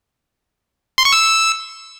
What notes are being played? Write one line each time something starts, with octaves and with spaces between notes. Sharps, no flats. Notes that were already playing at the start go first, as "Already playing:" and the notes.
C6
C#6
E6